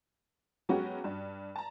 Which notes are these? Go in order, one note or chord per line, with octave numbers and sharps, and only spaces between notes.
F#3 G#3 B3 C#4 F#4 G4
G2
A5 A#5